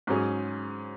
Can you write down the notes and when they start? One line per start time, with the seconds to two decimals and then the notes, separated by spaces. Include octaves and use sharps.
0.07 G#2 F#3 C#4 G#4